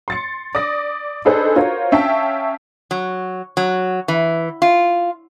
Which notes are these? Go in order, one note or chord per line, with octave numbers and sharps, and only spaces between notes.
C6 A6 C#7
D5 D#6 A#6
D4 D#4 G#4 A4 B4 C5
F4 F#4 A#4 C5 C#5
C#4 E5 F5 G5 A5
F#3
F#3
E3
F4